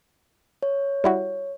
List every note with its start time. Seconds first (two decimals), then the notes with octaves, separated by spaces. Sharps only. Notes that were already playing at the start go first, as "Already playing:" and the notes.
0.63 C#5
1.04 G3 E4 F#4